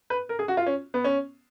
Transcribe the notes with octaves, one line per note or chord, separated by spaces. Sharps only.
B4
A#4
G#4
F#4
F4
C#4
B3
C#4